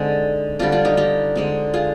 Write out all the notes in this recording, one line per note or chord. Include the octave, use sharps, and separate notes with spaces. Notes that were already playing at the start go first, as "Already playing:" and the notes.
Already playing: D3 G#3 C4 D#4
D3 G3 C4 D4 F4
D4 F4
D#4 G4
D#4 G4
D3 G#3 C4
F4 G#4